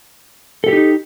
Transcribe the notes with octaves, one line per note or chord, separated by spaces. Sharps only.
D#4 G4 A4